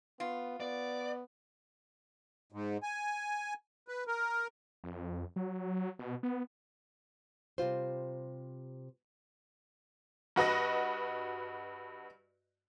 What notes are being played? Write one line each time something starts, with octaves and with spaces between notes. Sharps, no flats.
B3 F4
B3 D5
G#2
G#5
B4
A#4
F2
F#3
B2
B3
C3 G3 F4 C5
G2 F#4 B4 D#5 A#6